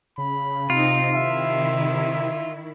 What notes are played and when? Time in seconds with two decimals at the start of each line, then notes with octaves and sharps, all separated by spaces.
0.18 C#3 B5
0.70 C3 C4 D#4 F4
1.14 D#3 E4 E5